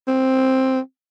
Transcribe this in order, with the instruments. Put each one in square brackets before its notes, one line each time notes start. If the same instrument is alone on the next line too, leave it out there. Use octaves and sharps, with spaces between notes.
[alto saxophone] C4